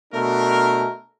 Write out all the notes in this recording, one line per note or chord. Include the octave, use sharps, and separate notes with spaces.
B2 A3 D4 A#4